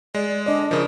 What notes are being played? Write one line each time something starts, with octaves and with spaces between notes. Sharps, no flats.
G#3 D5
D4 D5 D#5
C#3 F3 A#4